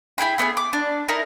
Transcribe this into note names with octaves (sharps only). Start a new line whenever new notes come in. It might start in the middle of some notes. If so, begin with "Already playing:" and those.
E4 G#4 G5 B5
A3 B3 D4 G#4
D6
D4
D#4 E4 A#4